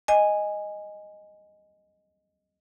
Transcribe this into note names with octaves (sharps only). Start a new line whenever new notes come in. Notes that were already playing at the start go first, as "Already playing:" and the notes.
D#5 G#5